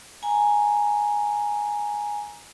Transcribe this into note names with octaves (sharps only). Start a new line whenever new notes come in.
G#5 A#5